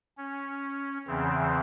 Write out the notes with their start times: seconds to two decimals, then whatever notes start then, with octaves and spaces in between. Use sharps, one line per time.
0.17 C#4
1.07 E2 C#3 E3 C4